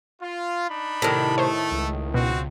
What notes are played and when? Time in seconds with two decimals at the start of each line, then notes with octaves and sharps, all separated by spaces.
0.21 F4
0.70 D4 D#4 B5
1.02 A2 C3 D#3 A#6
1.38 A3 C5 C#5
1.71 C#2
2.14 B2 C4 F#4